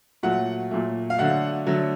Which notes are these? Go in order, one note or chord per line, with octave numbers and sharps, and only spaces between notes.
A#2 F#3 A3 F#5
A#2 F#3 A3
F5
D3 F#3 A3 F#5
D3 F#3 A3